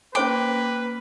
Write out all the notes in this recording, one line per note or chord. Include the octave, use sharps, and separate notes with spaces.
A#3 C#4 B4 C5 G5 C6 D6